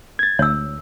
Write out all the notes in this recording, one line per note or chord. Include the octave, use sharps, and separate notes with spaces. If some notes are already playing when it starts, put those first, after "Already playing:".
G#6 A6
D2 C#5 E6